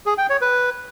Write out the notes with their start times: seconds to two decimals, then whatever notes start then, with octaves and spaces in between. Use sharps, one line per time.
0.06 G#4
0.18 G5
0.30 C#5
0.41 B4